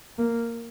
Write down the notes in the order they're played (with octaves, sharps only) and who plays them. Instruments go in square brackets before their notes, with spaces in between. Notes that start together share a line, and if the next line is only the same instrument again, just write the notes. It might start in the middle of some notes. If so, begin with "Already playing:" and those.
[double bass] A#3